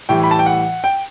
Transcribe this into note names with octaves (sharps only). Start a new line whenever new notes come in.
A2 E3 G3 G5
B5
A5
G5
F#5
G5